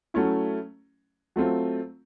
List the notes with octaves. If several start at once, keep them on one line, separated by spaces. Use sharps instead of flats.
F#3 A3 C#4 E4
F#3 A3 C4 F4